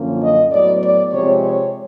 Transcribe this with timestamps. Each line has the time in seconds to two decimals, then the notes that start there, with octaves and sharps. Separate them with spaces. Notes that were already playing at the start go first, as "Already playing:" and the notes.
Already playing: F#2 D3 F3 A#3 C#4
0.22 D#5
0.52 A2 F#3 B3 D5
0.83 D5
1.12 C3 F3 G#3 C#5
1.42 C#5